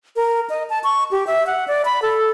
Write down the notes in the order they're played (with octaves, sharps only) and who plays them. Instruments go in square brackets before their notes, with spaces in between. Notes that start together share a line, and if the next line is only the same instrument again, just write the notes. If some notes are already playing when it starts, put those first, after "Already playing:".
[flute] A#4
D#5
A5
C#6
G4
E5
F#5
D5
B5
A4